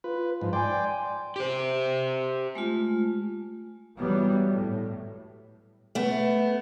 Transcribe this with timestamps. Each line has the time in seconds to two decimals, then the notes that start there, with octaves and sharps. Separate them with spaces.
0.04 F4 B4
0.41 G#2 F3
0.53 D5 G5 G#5 C6
1.36 G4 C5
2.55 G#3 A3 F4
3.98 E3 F#3 G3 B3
4.51 A2
5.95 A3 B3